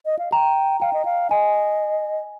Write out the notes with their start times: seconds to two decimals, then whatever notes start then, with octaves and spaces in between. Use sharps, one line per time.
0.06 D#5
0.19 F5
0.32 G5 A#5
0.81 F5 G5
0.93 D#5
1.05 F5
1.30 D#5 G#5